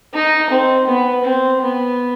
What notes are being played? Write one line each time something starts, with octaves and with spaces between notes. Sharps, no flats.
D#4
C4
B3
C4
B3